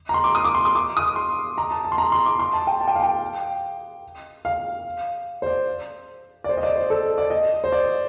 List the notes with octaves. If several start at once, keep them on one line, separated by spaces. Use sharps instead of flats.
A#5
C6
D6
D#6
D6
C6
D#6
D6
D#6
C6
A#5
A5
A5
C6
A#5
C6
D6
C6
A5
G5
A5
G5
F5
G5
F5
C5
D5
D5
C5
D#5
D5
C5
A4
D5
D#5
C5
D5